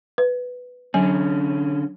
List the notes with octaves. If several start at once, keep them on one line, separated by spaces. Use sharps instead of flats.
B4
D3 F#3 C#4 G#5